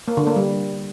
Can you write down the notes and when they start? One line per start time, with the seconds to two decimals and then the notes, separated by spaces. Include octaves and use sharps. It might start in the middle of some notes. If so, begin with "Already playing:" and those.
0.08 A#3
0.17 D3
0.27 A#3
0.36 G3